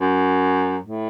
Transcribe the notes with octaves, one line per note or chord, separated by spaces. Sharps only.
F#2
A2